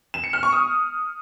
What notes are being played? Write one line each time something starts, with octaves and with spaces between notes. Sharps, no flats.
E7
C#7
F6
C#6
D#6